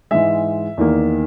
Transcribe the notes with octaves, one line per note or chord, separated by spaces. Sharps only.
G#2 E3 G#3 E5
E2 D#3 A#3